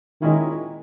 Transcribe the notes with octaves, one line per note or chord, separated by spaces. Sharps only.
A#2 D#3 G#3 C#4 E4